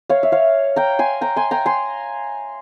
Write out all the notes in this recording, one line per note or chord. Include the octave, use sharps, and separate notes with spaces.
C#5 F5
E5
C#5 F5
G5 A#5
G#5 C6
G5 A#5
G#5 C6
G5 A#5
G#5 C6